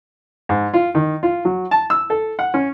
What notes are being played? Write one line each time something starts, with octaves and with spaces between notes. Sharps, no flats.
G#2
F4
D#3
F4
F#3
A5
E6
A4
F#5
C#4